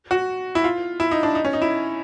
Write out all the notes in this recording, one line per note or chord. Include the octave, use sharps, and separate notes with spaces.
F#4
E4
F4
E4
D#4
D4
D#4
C#4
D#4
E4